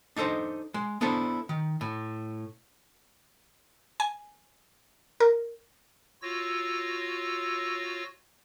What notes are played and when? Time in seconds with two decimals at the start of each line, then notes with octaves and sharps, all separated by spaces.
0.16 D4 D#4 A4 C5 D#5
0.74 G#3
1.01 B3 D4 E4 A4 C5
1.49 D#3
1.81 A2
4.00 G#5
5.20 A#4
6.22 F4 F#4 C#5 E6 A#6